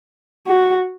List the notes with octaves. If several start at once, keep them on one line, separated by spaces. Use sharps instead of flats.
F#4